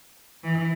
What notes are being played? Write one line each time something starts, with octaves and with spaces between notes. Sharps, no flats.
E3